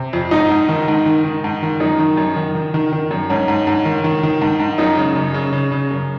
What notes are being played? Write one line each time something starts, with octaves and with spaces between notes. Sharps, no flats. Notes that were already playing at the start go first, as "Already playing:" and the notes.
Already playing: C3
F2
G#2 D#4
G#2
D#3
G#2
D#3
D#3
G#2
D#3
F#2 D#4
D#3
F#2
D#3
D#3
D#3
D#3
F#2
G#2 C#4
G#2
G#2
D#3
D#3
D#3
G#2
G#2
F#2 D#4
C#3
F#2
C#3
C#3
C#3
F#2